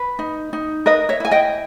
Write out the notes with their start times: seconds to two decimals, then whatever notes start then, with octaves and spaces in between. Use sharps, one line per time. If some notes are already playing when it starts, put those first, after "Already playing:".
Already playing: B4
0.19 D#4
0.53 D#4
0.86 A#4 B4 D#5
1.09 C#5 E5
1.20 E4 G#5
1.31 D#5 G5